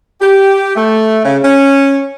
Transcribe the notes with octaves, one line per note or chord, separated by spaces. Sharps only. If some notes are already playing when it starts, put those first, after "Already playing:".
G4
A3
C#3
C#4